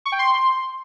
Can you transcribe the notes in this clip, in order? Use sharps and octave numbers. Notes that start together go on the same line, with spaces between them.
C#6
G5
C6